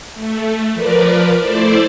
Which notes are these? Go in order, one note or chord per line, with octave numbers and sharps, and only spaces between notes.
A3
F3 A#4 B4 D5
A3 E4 C5 D5